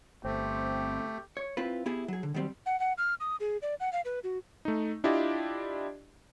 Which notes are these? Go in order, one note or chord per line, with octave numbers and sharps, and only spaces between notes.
G1 A3 C4 G4
C#5
C4 E4 F4 B4
B3 E4 G4 G#4
F#3 G#4
D3
D#3 F#3 G3 C4
F#5
F#5
F6
D#6
G#4
D5
F#5
F5
B4
F#4
A3 D#4
D4 E4 F4 G4 D5 D#5